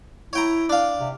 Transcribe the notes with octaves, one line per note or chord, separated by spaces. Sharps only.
E4 C#5 G5 A#5
D4 F5
C3